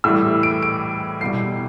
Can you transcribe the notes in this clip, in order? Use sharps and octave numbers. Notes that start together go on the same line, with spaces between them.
A2 E3 G3 E6
D7
D7
C2 B2 G3 C7